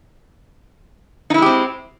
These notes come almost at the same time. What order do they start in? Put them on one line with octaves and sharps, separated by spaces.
D#4 E4 G#3 G4 C4